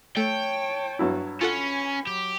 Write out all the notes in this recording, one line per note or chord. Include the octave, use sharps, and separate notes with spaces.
A3 C#5 G5 A5
G2 F#3 E4
C#4 F4 A4 F#5 G#5 B5
F#3 G4